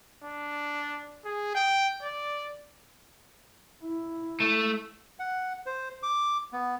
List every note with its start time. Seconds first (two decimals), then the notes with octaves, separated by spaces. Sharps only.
0.24 D4
1.25 G#4
1.55 G5
2.02 D5
3.84 E4
4.40 A3
5.19 F#5
5.66 C5
6.03 D6
6.53 B3